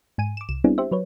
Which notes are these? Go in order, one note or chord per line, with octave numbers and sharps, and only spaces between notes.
G#2 G#5 D#7
D6 E7
C2 E7
G3 B3 C4 D4 E4 G#4
G4 C5 E5
F#3 B4 C#5